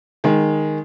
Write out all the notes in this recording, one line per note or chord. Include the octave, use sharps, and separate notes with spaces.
D#3 G#3